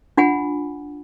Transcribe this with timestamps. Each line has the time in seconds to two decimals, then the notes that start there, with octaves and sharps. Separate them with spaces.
0.17 D4 F4 F#5 G#5 B5